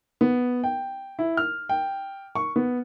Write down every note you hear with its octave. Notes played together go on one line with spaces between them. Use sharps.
B3
G5
E4
F6
G5
C#6
B3